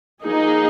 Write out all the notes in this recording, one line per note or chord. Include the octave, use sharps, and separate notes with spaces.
F3 A#3 D#4 G#4